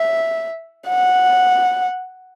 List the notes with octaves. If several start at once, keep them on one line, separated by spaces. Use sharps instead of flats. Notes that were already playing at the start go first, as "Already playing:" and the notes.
Already playing: E5
F#5